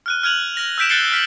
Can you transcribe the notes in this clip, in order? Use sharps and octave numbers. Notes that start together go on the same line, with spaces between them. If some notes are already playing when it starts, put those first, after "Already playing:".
F6 F#6 D#7
F6 F#6 G#6 D#7 F7 F#7
F6 A#6 F7
E6 F#6 G6 B6 D7 E7
F#6 G6 A6 C7 C#7 G7
F6 B6 D7 F#7